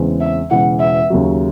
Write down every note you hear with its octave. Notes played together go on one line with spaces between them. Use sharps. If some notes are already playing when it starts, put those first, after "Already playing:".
Already playing: E2 C#3 E3 G#3 C4
E5
E1 E2 C#3 E3 F#5
E5
D#2 C#3 F#3